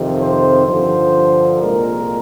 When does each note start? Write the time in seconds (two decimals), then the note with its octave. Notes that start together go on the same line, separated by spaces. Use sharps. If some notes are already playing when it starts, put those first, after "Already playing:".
Already playing: F2 C3 D#3
0.21 C5
0.67 G2 D3 F3 C5
1.60 C2 A#2 G#3 A#4